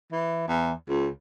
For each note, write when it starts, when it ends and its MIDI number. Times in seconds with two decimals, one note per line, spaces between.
0.12 0.48 52
0.48 0.73 40
0.88 1.08 37